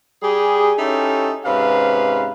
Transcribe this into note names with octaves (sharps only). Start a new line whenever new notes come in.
G3 G4 G#4
C#4 D#4 E4 G4 A4
G#2 C3 C#4 B4 F5